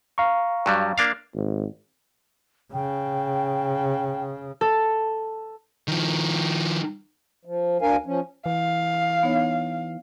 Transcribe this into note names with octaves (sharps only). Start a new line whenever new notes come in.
F5 A#5 C#6
G2 F#3 G3
A#3 D4 F5
G#1
C#3 G5
A4
D#3 F3
F3
D2 D4 A#4 F5 G#5
F3 C#4
E3 F5
B3 D#4 C#5